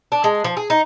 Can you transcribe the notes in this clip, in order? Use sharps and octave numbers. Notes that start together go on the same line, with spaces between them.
D4
G#3
F3
G#4
D#4